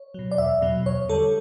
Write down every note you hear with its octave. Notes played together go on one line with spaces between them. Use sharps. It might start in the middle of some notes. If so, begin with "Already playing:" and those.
Already playing: C#5
B2 F#3
D5
E2 E5
B2 F#3
E2 C#5
D3 G3 A4